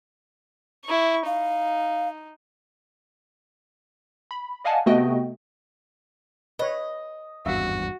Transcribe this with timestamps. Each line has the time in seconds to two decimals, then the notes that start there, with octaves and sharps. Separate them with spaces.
0.85 E4 C#6
1.26 D#4 F5
4.31 B5
4.64 D5 D#5 F5 F#5 G#5 A5
4.86 C3 A3 B3 F#4 D#5 G5
6.59 B4 C#5 D#5
7.46 G#1 E2 G2 F#4 E5 F5